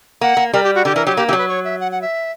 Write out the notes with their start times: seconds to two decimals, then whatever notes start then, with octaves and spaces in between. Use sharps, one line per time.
0.21 A#3 F#5
0.37 A#3
0.53 G3 A#4
0.63 G4
0.75 F#4
0.85 D3 G4
0.95 E3 A#4
1.06 F#3 G4
1.17 A#3 G4
1.27 E3 G4
1.33 F#3
1.38 B4
1.48 C#5
1.64 E5
1.80 F#5
1.91 F#5
2.02 E5